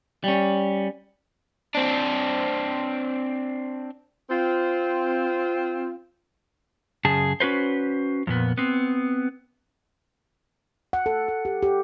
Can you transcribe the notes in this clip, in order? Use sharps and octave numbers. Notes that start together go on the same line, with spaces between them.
G3 C#4
C4 D4
C4 F4
F#2 C#3 G#4 A5
C#4 F#4 B4 C5
F2 A#2 B3
B3 C4
F#5
A4
A4
G4
G4